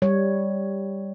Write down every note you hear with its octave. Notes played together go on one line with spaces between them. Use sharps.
G3 C#5